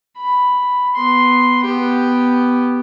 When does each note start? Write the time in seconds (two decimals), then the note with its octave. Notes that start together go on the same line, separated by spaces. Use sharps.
0.18 B5
0.95 B3 C6
1.65 B3 G4